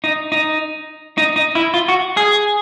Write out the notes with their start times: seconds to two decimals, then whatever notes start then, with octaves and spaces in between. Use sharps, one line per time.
0.04 D#4
0.32 D#4
1.18 D#4
1.36 D#4
1.55 E4
1.74 F4
1.88 F#4
2.17 G#4